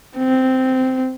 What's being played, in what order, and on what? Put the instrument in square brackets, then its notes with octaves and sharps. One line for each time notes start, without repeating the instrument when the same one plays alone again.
[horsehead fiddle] C4